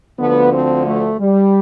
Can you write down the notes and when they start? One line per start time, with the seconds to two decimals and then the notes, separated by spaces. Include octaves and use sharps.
0.19 D2 D3 F3 B3
0.53 C4
0.87 A3
1.21 G3